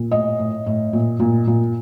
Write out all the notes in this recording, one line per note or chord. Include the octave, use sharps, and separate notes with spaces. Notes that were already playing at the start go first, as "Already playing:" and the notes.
Already playing: A#2
A2 D#5
A2
A2
A#2
A#2
A#2